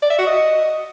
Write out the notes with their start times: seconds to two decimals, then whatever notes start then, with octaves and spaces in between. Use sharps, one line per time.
0.02 D5
0.10 E5
0.18 F#4
0.26 D#5